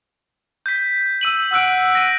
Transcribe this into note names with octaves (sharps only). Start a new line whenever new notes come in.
G6 B6
E6 D#7 F#7
F#5 E6 F#6 D7
A#6 D#7